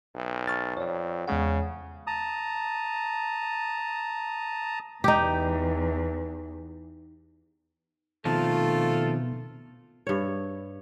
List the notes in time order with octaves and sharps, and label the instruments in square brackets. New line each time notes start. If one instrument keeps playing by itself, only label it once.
[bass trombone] B1
[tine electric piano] C#6 F6 A6
[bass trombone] F2 [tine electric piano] C#5 D5
[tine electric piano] E2 G#3 F#5 [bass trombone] C#3
[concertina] A5 A#5 D#6
[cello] E2 [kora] D#4 G4
[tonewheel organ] B2 [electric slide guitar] D#3 F3 C4 [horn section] A3 F4 [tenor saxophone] A4
[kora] G2 C#5